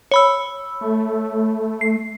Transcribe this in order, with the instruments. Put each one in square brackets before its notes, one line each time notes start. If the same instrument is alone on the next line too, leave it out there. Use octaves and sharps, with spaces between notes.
[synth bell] C#5 B5 E6
[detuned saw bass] A3
[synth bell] C7